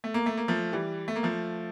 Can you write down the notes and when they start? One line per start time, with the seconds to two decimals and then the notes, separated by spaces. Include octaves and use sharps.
0.04 A3
0.14 A#3
0.26 A3
0.37 A#3
0.48 F3 A3
0.73 E3 G3
1.08 A3
1.16 A#3
1.23 F3 A3